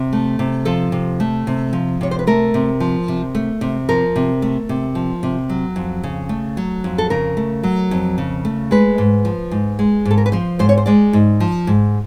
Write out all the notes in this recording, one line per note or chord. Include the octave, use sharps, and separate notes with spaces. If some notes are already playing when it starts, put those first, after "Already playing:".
Already playing: C3
A3
C3
F3 A4
C3
A3
C3
F3
C3 C#5
C5
B4
A3 A#4
C3
F3
C3
A3
C3
F3 A#4
C3
A3
C3
F3
C3
F#3
F2
C#3
A3
F#3
F2
A4
C#3 A#4
A3
F#3
F2
C#3
A3
G#3 B4
G#2
F3
G#2
G#3
G#2
A4
A#4
B4
F3 C5
G#2 C5
C#5
C5
G#3 D5
G#2
F3
G#2